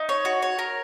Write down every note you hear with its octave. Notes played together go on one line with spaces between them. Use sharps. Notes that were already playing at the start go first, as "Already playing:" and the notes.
Already playing: D#4
C#5
F#4
C#5
A#4